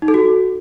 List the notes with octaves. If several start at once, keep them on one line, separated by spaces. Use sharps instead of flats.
D#4
A4
F#4